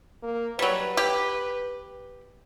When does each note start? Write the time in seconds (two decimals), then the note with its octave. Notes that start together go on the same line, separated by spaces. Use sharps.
0.23 A#3
0.59 F#3 G3 B4
0.97 G4